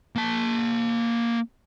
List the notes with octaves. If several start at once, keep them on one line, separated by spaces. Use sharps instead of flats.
A#3 A5